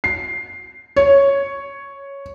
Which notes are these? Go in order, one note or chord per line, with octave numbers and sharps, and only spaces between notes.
C7
C#5